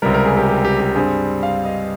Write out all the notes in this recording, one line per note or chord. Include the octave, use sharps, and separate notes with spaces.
C#2 C3 G3 A#4
A#4
G#4
G4
G4
G4
G4
G2 G3 C4 G#4
F5
D#5